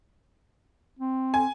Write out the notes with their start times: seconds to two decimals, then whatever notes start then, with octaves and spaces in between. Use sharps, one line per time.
0.99 C4
1.34 G#5